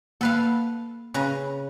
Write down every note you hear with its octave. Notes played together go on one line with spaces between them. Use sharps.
A#3 A4 B4 F5
C#3 B4 A#5